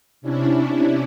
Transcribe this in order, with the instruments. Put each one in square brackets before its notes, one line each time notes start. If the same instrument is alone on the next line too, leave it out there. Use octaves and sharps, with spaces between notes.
[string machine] C3 C#4 D4 E4